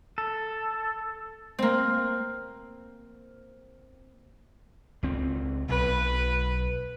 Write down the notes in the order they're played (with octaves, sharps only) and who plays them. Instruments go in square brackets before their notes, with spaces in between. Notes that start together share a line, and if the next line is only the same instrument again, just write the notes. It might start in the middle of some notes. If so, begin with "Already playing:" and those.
[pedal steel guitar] A4
[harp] A#3 C4
[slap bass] C#2 C4
[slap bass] B1 [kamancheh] B4